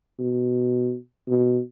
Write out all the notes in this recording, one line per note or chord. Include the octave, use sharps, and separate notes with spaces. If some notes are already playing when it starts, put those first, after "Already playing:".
B2
B2